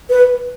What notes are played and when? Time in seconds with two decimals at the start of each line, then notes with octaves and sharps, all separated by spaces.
0.10 B4